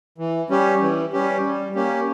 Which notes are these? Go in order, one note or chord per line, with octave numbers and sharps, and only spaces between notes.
E3
G3 C#4 G4
E3
G3 C#4 G4
G3
A#3 C#4 G4